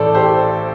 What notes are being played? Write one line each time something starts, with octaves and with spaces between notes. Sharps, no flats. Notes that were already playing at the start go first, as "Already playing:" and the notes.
Already playing: A1 A2 E3 A4 C5 D5
G4 C5